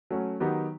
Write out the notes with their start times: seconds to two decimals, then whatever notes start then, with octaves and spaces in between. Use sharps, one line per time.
0.11 F#3 A3 C#4
0.40 D#3 F#3 B3 D#4 G4